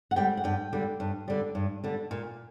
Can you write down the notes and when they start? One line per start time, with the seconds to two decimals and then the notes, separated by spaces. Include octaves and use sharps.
0.11 F#5
0.16 D3 G3 G5
0.37 F#5
0.44 G2 G5
0.73 D3 G3
1.00 G2
1.28 D3 G3
1.55 G2
1.84 D3 G3
2.11 A#2